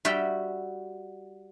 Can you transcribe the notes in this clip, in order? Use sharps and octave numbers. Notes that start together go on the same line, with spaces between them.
G3 F#4 E5 G5